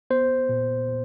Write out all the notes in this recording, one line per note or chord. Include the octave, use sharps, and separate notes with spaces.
B3 C5
A#2
A#2